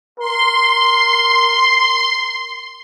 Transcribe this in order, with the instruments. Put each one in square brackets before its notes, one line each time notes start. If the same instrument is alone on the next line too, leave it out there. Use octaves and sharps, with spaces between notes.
[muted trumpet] A#4 [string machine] C6